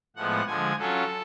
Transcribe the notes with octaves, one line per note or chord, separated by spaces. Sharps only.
A2 F3 G#3 B3 F#5
D3 F3 G#3 G#5
F#3 C#4 F4 A4